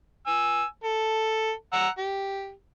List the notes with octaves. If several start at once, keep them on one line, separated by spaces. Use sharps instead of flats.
G#5 E6
A4
F#5 A#5 E6
G4